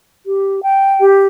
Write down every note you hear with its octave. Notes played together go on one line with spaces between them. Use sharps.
G4
G5
G4